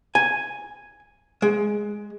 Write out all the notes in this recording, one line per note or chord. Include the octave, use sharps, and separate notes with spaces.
G#5
G#3